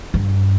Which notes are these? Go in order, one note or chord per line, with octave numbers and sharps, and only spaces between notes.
G2